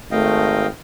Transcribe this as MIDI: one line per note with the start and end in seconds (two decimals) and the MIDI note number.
0.11 0.67 32
0.11 0.67 57
0.11 0.67 75
0.11 0.67 77
0.11 0.67 79